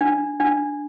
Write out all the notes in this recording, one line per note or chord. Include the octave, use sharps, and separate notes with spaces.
D4
D4